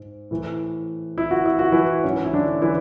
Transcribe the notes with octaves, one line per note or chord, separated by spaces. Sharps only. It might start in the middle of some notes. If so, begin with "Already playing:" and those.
Already playing: G#2
A2 E3
E4
F#4
E4
F#4
E3 E4
G#2 E3 C#4
E4
D3 D4
E3 E4